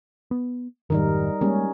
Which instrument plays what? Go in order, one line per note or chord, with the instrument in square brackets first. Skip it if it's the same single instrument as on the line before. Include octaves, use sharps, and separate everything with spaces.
[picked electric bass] B3
[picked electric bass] F1 G#2 D#3 [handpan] G3 D#4 A#4
[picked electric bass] G3 G#3 A#3 [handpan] C#4